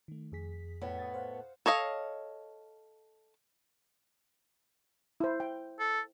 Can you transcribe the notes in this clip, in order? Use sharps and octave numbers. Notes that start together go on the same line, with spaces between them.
D#3 A3
F2 G#4 B6
A2 B3 C#5
D#6 A6
C5 F5 F#5
A4 C#5 D#5 F5
E4 C5
G5
A4